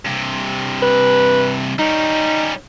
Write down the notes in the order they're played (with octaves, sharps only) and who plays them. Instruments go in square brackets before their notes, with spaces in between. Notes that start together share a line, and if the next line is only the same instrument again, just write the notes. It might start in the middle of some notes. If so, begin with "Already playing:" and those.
[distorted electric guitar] G2 C3
[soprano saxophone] B4
[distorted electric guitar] G3 C#4 [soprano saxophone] D#4